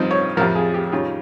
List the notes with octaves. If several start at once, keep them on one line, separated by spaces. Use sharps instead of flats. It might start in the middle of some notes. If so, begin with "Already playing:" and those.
Already playing: G2 F3 C4 D#4
C#5
F2 C3 F3 A#4
G#4
G4
D#3 G3 C#4 F4